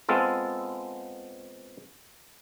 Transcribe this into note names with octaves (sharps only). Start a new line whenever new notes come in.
G#3 B3 C4 F4 A4